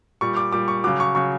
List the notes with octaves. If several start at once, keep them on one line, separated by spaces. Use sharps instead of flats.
A#2 G3 C#6
D6
A#2 G3 D6
C#6
C#3 F#3 D6
C#6
C#3 F#3 C#6